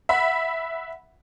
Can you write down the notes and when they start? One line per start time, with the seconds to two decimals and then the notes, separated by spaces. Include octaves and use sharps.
0.09 E5 F#5 B5